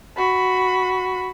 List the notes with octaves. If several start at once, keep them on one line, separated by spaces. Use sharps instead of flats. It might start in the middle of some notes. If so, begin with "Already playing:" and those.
F#4 B5